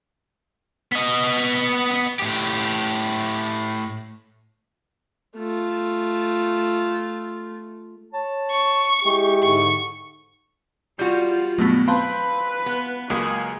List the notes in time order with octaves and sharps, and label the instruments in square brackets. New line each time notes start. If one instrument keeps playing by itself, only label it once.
[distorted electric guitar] B3 D#5
[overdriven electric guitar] A2 G4
[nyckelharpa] A3 F4
[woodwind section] C#5 A5
[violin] C#6
[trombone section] G#3 E4 G4
[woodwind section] G#2 D3 [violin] C#6
[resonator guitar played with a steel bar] G3 F#4 [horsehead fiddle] F4 [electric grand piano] G6
[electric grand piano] G2 B2 [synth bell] F#3 A3 B3
[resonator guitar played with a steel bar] C4 [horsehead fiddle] B4 [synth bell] F5 A5 [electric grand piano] B5 C6
[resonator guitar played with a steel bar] B3
[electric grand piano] C#2 A#3 D#6 [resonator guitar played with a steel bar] F#3 G#3 G#4